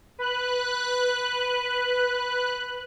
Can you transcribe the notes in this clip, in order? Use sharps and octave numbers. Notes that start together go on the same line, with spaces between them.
B4 F#6